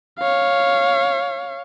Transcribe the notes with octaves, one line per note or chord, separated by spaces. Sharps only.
C#5 F5